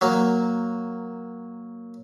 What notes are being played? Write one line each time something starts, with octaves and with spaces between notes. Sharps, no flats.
F#3 A#3